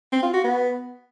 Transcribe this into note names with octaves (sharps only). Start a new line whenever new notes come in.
C4
F4
F#4
B3